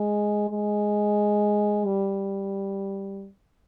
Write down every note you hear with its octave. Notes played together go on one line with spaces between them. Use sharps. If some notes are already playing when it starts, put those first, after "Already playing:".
Already playing: G#3
G#3
G3